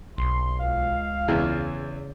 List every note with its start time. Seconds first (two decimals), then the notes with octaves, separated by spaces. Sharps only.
0.18 B1 C6
0.58 C#2 F5
1.28 E2 C#3 E3